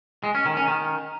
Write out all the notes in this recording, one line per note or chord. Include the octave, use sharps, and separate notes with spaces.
G#3
C#4
D#3
C#4
D#3